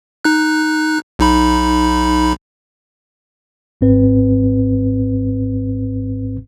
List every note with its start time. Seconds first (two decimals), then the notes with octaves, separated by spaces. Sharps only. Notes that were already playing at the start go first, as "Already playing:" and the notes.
0.25 D#4 F#6
1.19 B1 D#4 B5
3.81 G#1 G#2 C4 B4